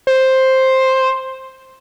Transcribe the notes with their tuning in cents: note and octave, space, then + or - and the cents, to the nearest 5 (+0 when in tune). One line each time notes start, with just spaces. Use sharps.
C5 +5